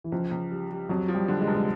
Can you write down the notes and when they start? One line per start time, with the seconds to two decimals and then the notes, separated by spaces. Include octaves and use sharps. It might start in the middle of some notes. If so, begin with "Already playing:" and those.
0.04 E3
0.12 C#2 F3
0.31 C#2
0.50 G3
0.71 G3
0.89 F2 F#3
1.08 F3
1.14 G3
1.28 D3
1.41 G#3
1.47 F1
1.55 G#3